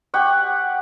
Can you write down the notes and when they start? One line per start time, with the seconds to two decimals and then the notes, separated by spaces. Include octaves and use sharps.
0.14 G4 F#5 C#6